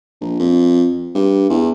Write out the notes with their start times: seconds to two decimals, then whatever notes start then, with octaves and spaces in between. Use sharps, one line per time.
0.21 A#1
0.39 F2
1.15 G2
1.50 E2